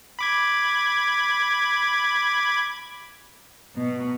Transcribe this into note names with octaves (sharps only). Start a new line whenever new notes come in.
B5 D6 G#6
B2